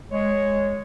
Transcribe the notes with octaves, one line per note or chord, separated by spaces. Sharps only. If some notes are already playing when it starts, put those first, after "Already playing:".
G#3 C#5